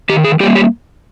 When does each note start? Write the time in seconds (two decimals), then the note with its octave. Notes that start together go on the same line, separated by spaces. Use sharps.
0.09 D#3 G4
0.24 G#4
0.40 G3 G4
0.43 A#3
0.55 G4